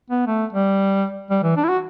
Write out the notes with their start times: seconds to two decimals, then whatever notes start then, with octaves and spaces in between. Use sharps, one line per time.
0.10 B3
0.27 A3
0.53 G3
1.31 G3
1.43 E3
1.57 D4
1.64 E4
1.69 F#4